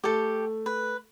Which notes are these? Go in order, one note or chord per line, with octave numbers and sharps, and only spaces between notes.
A3 G4 A4
B4